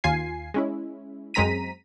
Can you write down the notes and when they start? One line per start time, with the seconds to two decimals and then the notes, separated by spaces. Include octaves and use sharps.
0.04 D#2 F4 G#5 C7
0.54 G#3 C#4 E4
1.34 F#2 G#3 C4 A#5 B6 D#7